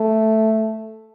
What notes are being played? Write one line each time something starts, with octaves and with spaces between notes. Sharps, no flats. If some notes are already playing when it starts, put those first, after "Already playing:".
Already playing: A3